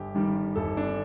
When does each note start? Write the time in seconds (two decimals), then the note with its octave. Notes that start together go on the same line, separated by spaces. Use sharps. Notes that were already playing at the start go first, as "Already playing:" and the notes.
Already playing: G1 G4
0.15 G2 D#3 G3
0.56 G1 A4
0.77 D4